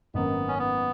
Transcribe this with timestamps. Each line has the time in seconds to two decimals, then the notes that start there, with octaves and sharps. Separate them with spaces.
0.14 G#1 F#2 D#3 A#3 B3
0.48 C#4
0.59 B3